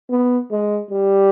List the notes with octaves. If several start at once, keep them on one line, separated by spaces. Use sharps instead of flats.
B3
G#3
G3